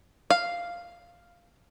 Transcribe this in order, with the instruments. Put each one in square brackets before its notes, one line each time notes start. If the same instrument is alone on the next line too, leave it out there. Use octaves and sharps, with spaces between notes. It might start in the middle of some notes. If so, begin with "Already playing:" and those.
[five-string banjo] F5